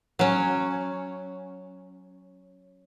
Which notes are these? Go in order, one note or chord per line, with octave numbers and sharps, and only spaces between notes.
F#3 C#4